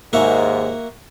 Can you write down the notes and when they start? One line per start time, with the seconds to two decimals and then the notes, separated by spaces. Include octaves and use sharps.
0.13 D#2 G#2 A#3 F#4 E5